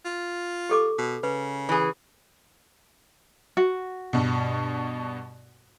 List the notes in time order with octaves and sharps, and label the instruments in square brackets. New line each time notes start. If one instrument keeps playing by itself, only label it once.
[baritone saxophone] F4
[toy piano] G4 A4 D6
[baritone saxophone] B2
[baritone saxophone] C#3 [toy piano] B4
[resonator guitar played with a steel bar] E3 G#4
[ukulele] F#4
[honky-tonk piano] G2 B2